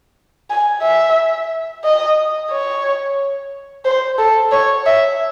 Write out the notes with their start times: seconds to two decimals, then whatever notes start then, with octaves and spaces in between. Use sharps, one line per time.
0.50 G#5
0.82 E5
1.84 D#5
2.51 C#5
3.85 C5
4.19 A4
4.52 C#5
4.86 E5